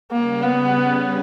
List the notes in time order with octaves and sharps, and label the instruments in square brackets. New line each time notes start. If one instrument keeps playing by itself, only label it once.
[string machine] C#3 G3 C#4 [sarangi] A#3
[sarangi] B3